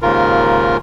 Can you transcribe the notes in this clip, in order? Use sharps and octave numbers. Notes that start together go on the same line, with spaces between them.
D#2 G#2 C#3 F4 A#4